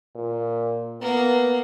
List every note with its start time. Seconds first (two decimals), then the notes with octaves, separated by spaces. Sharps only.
0.16 A#2
1.02 A#3 B3